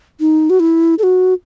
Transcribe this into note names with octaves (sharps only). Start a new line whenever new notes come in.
D#4
F#4
E4
A4
F#4